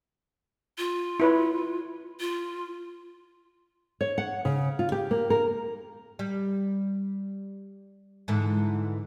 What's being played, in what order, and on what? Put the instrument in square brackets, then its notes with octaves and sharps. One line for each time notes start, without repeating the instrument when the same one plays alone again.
[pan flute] F4
[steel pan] E4 B4 C#5
[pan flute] F4
[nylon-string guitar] C#5
F#5
C#3
F4
G4
A#3
A#4
[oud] G3
G#2 D3 E3